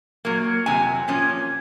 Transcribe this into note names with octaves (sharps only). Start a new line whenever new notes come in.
A#2 F#3 A#3
F2 C3 F#3 G#5
A#2 F3 A#3 C#4